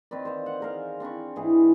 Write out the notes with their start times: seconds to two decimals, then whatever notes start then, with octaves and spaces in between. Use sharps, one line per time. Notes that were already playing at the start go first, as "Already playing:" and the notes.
0.11 D#3 C4 B4 D5
0.25 C5 F5
0.46 F#5
0.60 G#4 A#4 F5
1.00 C4 D4 B5 C#6
1.36 G#2 E3 E4 G#4